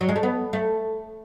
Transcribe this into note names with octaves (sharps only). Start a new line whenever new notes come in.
F#3
G#3
A3
B3
A3